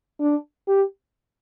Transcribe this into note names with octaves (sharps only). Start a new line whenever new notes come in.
D4
G4